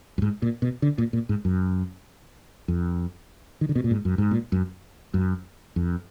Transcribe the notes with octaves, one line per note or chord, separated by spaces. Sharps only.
F#2
G#2
A#2
B2
D3
A#2
A#2
G#2
F#2
F2
D#3
D3
B2
A#2
G#2
F#2
G#2
A#2
F#2
F#2
F2